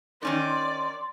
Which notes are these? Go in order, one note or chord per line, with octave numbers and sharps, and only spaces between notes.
D#3 C#4 D#4 D5 C6